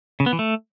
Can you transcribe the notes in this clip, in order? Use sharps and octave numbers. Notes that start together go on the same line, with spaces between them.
C#3
B3
E3
A3